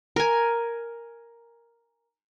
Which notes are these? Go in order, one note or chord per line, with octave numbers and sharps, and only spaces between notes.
A#4 G#5